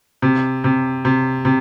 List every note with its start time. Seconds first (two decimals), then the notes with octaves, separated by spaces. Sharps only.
0.22 C3
0.64 C3
1.05 C3
1.45 C3